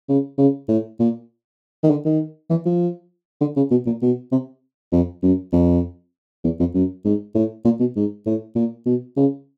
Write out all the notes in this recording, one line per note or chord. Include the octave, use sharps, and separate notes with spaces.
C#3
C#3
A2
A#2
D#3
D3
D#3
E3
F3
D3
C#3
B2
A#2
B2
C3
F2
F#2
F2
E2
F2
F#2
G#2
A2
A#2
B2
G#2
A2
A#2
B2
C#3